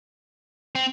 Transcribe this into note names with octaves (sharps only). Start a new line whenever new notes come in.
C4